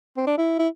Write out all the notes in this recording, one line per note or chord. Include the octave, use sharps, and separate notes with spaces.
C4
D4
E4
E4